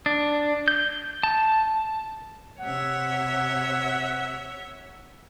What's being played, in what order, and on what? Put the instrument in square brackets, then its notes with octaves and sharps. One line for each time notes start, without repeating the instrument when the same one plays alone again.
[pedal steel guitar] D4
G6
A5
[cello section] C3 [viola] C#5 E5 [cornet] F#5